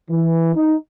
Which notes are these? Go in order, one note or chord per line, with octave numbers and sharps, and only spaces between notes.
E3
D#4